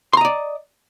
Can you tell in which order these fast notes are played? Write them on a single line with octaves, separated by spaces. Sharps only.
C6 A#5 D#5 D5